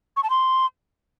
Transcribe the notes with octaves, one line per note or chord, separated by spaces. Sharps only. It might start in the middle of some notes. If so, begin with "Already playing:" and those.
C#6
A5
C6